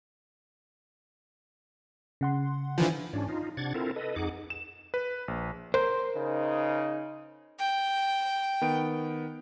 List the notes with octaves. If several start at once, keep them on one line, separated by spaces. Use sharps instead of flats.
C#3 F#5 C6
D3 E3 F3
G#2 C#4 D4
D#4 F4
C3 D4 F#5 G#6 A6
C4 E4 F4 A4 A#4
A4 B4 D#5
F2 D#4 G#4 F#5 D6
E7
B4
A#1
A#4 C5
C#3 D#4
G5
D#3 B3 D7